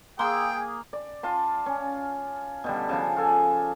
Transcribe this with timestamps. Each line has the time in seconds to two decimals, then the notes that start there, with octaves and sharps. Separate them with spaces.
0.19 A#3 G#4 G5 C6 E6
0.93 D5
1.23 F4 A5 C6
1.66 C#4
2.64 B2 D3 G3
2.89 C#3 F3 D4
3.16 F4 A4 G#5